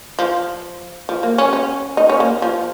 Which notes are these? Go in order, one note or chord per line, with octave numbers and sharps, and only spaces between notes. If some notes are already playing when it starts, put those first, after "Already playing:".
F3
F3
A#3
C#4
C#4
D#4
C#4
A#3
F3